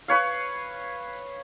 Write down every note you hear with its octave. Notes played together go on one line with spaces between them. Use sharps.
B4 C#5 F5